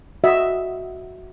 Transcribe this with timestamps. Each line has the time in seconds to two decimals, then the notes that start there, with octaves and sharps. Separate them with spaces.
0.24 F#4 D#5 E5